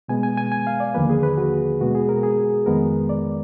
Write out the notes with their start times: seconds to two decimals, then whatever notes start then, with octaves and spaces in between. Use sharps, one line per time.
0.08 B2 G#3 B3 G#5
0.23 G#5
0.37 G#5
0.52 G#5
0.67 F5
0.80 D5
0.95 D#2 D3 F3 A#3 B4
1.10 G#4
1.23 B4
1.38 F#4
1.81 B2 G#3 B3 F#4
1.95 G#4
2.09 A#4
2.23 G#4
2.66 F2 D#3 G#3 B3 A#4
3.09 D5